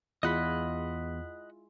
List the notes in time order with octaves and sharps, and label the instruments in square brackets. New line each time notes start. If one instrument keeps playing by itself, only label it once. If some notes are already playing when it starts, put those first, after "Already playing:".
[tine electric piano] E2 [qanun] G#3 E4 F4 [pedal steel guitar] D#5 F#5 B5